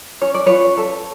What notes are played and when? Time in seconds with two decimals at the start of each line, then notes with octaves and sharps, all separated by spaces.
0.21 C#4 C#5
0.34 D5
0.46 F4 B4 C#5
0.77 A4